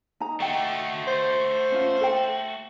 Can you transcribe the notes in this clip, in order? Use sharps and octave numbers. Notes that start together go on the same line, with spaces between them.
D#4 A#5
A3 F#4 D#5 G5
C5
C#4 F4
A4 G5